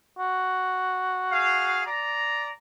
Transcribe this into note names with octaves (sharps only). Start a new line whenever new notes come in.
F#4
G#4 F5
D5 A#5